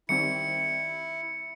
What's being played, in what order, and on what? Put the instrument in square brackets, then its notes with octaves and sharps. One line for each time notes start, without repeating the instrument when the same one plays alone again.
[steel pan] D#3 G3 C4 [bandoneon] E4 [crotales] C#7